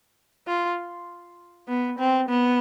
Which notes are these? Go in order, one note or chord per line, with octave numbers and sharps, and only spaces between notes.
F4
B3
C4
B3